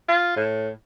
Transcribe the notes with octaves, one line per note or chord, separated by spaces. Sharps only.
F4
A2